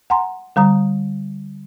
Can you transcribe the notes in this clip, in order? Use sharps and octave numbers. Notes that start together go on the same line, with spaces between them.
F#5 G#5 A#5 C6
D3 G3 A#5 D#6